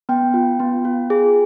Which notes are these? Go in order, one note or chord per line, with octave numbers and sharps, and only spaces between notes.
B3 G5
F4
B3
F4
G#4